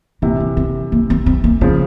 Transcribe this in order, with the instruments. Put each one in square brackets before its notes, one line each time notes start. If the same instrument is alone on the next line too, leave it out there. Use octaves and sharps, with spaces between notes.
[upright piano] C3 E3 [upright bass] A#3
[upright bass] C#4
C4
A#3
C4
C4
A#3
[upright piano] C#3 F3 [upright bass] C4